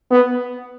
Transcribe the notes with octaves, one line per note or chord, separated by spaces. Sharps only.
B3